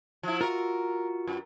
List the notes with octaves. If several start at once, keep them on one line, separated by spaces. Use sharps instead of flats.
F3 E4
F4 F#4 A#4
F#2